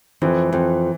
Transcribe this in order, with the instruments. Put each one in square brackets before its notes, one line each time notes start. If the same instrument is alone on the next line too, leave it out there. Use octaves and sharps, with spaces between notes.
[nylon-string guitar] F2 [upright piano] E3
[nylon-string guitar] F2